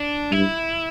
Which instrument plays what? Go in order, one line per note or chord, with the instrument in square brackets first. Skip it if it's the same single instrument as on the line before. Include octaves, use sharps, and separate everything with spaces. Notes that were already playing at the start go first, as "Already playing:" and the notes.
Already playing: [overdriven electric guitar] D4
[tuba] G2 [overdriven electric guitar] E4